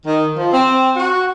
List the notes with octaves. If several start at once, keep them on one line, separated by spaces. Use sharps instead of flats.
D#3
F3
C4
F#4